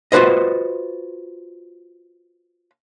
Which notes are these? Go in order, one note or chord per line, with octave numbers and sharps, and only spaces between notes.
F4 F#4 B4 C5 D#5